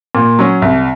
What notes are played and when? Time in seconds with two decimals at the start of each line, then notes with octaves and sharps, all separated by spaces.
0.15 A#2
0.39 F#3 C#4
0.62 C2